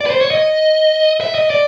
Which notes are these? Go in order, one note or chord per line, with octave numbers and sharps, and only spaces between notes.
D5
B4
C5
C#5
D#5
E5
D#5
D5